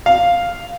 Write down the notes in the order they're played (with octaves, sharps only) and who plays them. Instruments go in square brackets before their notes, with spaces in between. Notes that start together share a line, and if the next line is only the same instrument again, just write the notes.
[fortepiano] F5